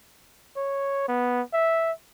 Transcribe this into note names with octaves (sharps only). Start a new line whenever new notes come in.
C#5
B3
E5